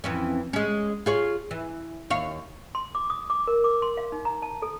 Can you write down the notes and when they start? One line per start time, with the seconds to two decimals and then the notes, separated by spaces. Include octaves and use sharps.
0.04 F2 E3 C#4
0.53 G#3 C#4
1.06 F4 G#4 C#5
1.51 E3
2.10 D#2 C#5 F5
2.75 C6
2.95 D6
3.10 D#6
3.30 D6
3.47 A#4
3.64 D6
3.82 C6
3.97 F5
4.12 D#4
4.25 A#5
4.42 A5
4.62 A4